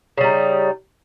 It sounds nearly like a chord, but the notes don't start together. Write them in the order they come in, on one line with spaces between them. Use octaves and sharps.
C#3 G3 D#4